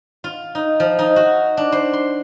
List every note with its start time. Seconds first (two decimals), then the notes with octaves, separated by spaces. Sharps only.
0.24 F4
0.55 D#4
0.80 F3
0.99 D#4
1.16 F#4
1.57 D4
1.72 C5
1.93 C6